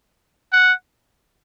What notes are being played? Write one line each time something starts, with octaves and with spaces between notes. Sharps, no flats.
F#5